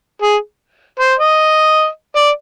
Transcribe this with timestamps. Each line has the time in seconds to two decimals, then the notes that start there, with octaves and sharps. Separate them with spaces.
0.22 G#4
1.00 C5
1.19 D#5
2.16 D5